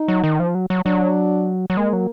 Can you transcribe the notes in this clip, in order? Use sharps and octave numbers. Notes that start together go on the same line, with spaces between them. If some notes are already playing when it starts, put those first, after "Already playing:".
Already playing: D#4
F#3
D#3
F3
F#3
F#3
F#3 D4
F#3
G#3 A#3
F#3